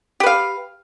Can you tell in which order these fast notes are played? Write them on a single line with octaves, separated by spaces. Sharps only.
G4 B4 F5